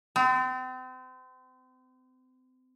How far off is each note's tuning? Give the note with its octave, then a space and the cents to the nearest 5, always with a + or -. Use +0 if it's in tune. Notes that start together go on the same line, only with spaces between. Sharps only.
C4 -35